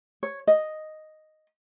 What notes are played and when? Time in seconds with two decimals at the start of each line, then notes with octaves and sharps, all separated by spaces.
0.23 C#5
0.47 D#5